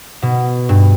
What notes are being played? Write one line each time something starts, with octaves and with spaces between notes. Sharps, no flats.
B2
G2